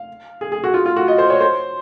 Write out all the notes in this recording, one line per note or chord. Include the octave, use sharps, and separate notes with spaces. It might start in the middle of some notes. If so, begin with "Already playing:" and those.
Already playing: F5
G#4
G#4
F#4
F4
F4
F#4
D#5
C5
C#5
C5